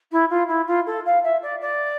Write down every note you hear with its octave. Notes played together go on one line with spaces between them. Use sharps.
E4
F4
E4
F4
A4
F5
E5
D5
D5